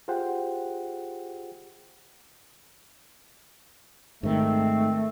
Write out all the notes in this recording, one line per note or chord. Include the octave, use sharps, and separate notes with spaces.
F4 G4 G#4 C5 F#5 G5
G#2 D#3 A3 C4